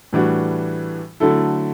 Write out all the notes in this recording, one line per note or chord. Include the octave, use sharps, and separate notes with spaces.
A2 E3 G3 D4 F#4
D3 F#3 A3 E4 A4